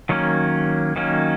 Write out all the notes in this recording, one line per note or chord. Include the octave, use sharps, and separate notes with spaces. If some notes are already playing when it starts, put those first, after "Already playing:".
D#3 F#3 A#3 C#4
D#3 F#3 A#3 C#4